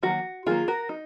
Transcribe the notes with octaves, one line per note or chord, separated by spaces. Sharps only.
D#3 F#3 A#3 F#4
D#3 F#3 A#3 F4 G#4
F#4 A#4
D#4